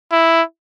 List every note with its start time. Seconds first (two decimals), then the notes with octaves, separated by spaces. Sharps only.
0.12 E4